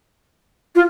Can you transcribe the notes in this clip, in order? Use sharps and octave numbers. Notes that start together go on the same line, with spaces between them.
F4